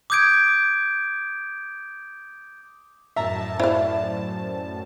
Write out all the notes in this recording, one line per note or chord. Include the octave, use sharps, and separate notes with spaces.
D6 D#6 G6 G#6 D7
F#2 A2 E5 A5 A#5
E4 C5 D5 F5